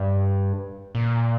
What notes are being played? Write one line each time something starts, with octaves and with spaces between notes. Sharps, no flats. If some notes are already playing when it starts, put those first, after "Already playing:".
Already playing: G2
A#2